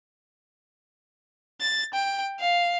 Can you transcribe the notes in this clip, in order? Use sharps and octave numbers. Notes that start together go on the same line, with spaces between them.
A6
G5
F5